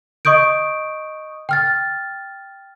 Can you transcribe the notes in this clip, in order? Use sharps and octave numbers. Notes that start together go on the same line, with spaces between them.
D#5 C#6 D#6 G6 D7
G5 F6 A6